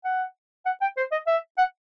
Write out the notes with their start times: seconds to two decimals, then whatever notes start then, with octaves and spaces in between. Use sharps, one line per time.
0.05 F#5
0.66 F#5
0.82 G5
0.97 C5
1.12 D#5
1.27 E5
1.58 F#5